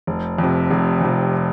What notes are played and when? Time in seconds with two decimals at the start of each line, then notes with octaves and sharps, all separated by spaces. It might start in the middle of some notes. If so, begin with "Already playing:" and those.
0.07 F1
0.38 F2 C3
0.71 F1
1.01 F2 C3